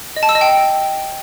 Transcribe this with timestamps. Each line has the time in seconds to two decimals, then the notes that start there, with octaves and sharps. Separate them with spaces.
0.16 D#5
0.23 A5
0.29 E6
0.35 D#5
0.41 G5